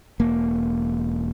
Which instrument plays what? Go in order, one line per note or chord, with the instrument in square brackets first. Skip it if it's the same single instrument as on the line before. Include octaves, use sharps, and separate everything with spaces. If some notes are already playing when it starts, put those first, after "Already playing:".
[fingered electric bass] E1 A#3